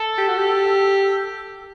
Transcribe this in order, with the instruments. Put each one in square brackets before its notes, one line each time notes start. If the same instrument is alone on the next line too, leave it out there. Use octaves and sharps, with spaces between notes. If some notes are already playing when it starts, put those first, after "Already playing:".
Already playing: [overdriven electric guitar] A4
[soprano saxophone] G4
F#4
G4